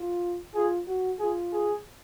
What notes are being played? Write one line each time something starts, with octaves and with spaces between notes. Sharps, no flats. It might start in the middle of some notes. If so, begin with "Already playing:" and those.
Already playing: F4
F4 G#4
F#4
F4 G#4
G#4